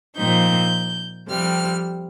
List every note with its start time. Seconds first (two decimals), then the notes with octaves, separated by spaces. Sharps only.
0.16 A#2 F3 C4 D#4 G6
1.29 F2 C3 G3 F6